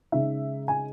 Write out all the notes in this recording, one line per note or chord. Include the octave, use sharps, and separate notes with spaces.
C#3 G#3 D#4 E5
G#5